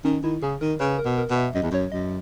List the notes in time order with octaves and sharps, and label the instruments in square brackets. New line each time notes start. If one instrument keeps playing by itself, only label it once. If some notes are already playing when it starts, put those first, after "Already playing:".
[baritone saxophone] D#3 [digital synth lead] C#4
[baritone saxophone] D#3 [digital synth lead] E4
[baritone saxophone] C#3 [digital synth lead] G#4
[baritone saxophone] D#3 [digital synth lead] A#4
[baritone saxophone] C#3 [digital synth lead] B4
[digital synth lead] A#4
[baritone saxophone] B2
[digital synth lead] A#4
[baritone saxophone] B2
[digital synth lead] E5
[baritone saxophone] F#2 [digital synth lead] D#5
[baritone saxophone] E2
[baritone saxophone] F#2 [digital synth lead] C#5
[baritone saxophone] F#2 [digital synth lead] D#5